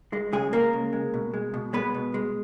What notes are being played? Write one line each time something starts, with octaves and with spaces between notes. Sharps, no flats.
G#3
C#3 G#3 G#4
G#3 A#3 A#4
C#3
G#3
B2
G#3
B2
G#3 B3 B4
B2
G#3